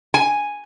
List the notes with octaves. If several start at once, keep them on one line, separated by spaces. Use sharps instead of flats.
G#5